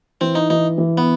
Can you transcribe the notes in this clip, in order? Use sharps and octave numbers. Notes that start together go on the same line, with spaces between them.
E3 C4
D#4
E3 D#4
E3
B3